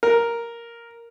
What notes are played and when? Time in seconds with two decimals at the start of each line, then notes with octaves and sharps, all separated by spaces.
0.03 A#4